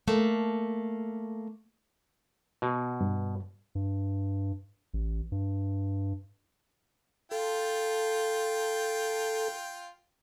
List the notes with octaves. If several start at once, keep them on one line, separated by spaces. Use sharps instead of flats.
A3 A#3
B2
G2
G2
A1
G2
F4 A4 G5